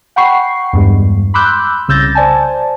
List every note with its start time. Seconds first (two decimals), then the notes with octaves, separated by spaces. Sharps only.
0.16 F#5 G5 B5 C#6 C7
0.73 E2 G2 G#3
1.34 B5 C6 D6 E6 F#6 G6
1.88 C2 C#3 E6 G6 A6 A#6
2.15 C5 D5 G#5 A5